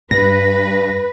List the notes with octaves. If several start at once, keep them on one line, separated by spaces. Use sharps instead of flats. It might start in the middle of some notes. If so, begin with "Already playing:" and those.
G2 B4 A#6